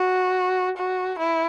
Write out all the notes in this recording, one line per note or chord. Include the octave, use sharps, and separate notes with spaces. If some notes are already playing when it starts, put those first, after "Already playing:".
Already playing: F#4
F#4
E4